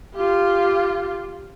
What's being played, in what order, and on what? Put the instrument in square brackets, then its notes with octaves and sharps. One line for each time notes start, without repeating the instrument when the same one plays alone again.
[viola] F4 G4